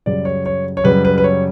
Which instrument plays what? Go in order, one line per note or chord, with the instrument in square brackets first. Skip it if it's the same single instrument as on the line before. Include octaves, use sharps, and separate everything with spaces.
[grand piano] F#2 C#3 G3 D5
C#5
C#5
C#5
F#2 C#3 G3 B4
B4
B4
C#5